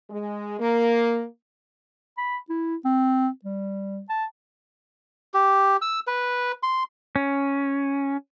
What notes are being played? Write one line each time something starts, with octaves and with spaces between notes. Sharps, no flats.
G#3
A#3
B5
E4
C4
G3
A5
G4
E6
B4
C6
C#4